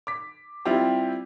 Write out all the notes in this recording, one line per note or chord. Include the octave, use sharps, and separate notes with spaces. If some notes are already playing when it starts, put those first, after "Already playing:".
D6 B6
G3 C4 E4 F4 G4